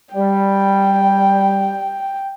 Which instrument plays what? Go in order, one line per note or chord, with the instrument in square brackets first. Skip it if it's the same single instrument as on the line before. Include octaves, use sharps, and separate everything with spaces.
[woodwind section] G3 [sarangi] G5